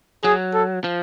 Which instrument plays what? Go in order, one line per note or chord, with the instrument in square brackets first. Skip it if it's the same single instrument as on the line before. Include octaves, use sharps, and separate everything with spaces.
[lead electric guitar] F#3 [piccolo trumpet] G#4
[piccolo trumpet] A4
[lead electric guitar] F3